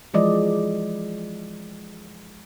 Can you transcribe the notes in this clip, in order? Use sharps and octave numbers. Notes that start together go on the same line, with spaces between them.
E3 F3 G#3 D5 D#5